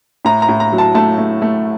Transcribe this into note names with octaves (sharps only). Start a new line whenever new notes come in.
A2 A#5
A#5
A2
A#5
F#3
A5
A3 A5
A3
A3